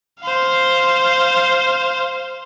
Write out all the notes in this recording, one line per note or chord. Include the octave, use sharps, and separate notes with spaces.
C5 F5